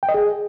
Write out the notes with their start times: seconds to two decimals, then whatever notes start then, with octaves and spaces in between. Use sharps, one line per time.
0.03 G5
0.09 D#5
0.14 G#4